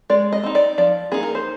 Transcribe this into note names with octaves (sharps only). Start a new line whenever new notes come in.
G#3 D5
D#5
C4 D#4
D5
F3 D5
A#3 D#4 G#4
A#4
C5